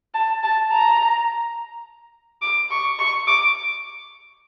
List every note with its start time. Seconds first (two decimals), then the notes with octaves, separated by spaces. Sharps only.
0.14 A5
0.43 A5
0.71 A#5
2.42 D6
2.70 C#6
2.99 C#6
3.27 D6